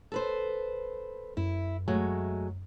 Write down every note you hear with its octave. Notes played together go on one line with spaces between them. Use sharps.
A4 B4 C5
F#2 E4
F#3 G#3 A3